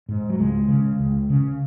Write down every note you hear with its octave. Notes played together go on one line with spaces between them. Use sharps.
G#2
F#3
C#2 G#3
C#3
C#2
C#3